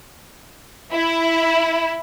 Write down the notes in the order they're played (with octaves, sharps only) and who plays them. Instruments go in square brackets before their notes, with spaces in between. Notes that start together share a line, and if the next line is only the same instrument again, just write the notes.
[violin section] E4